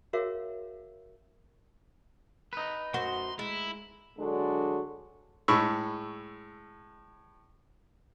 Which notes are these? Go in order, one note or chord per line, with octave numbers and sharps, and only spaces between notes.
F#4 G#4 A#4 C#5 E5 F5
D#4 B4
F#2 F#4 C5 C6
G#3 E4
D3 F#3 G#3 D4 F#4 A4
A2 G#3 B5 C#6 E6